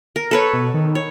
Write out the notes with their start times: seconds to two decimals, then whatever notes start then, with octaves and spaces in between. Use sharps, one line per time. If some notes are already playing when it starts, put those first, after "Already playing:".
0.16 A#4
0.31 A4 B4 C#5
0.54 B2
0.74 D#3
0.95 C#5